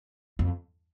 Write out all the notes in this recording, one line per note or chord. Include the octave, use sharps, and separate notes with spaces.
F2